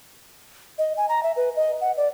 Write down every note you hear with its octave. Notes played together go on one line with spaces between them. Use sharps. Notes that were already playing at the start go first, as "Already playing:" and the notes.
D#5
G#5
A#5
E5
B4
D#5
F#5
D5